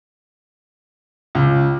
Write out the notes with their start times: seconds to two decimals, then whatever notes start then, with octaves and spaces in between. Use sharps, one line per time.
1.35 C#2